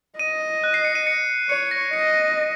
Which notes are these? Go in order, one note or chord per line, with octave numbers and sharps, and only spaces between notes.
D#5 D#7
F#6
C7
C#7
D#7
C#7
C#5 C#7
A#6
D#5 C#7